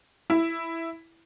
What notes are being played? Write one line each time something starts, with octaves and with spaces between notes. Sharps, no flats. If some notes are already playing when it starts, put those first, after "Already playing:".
E4